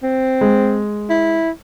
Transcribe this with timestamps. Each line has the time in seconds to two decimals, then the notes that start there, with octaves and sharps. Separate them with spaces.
0.03 C4
0.41 G#3
1.10 E4